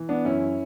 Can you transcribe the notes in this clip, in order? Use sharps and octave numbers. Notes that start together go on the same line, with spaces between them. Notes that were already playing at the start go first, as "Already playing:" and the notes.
Already playing: E3
B3 D4
F#2 C#4 E4